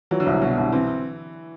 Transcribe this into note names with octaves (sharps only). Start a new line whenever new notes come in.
E3 F#3
D3
C2 E3
B2 F#3
C2 D3
E3 C4